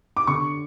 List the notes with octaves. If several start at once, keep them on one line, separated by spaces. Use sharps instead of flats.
D6
D3 C#6